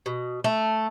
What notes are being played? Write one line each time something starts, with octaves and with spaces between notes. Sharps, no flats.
B2
A3